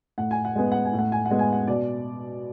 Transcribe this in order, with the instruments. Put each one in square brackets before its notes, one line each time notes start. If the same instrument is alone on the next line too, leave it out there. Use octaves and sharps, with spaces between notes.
[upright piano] A2 F#5
G#5
F#5
G#3 B3 G#5
F#5
G#5
A2
F#5
G#5
F#5
G#3 B3
G#5
F#5
B2 D5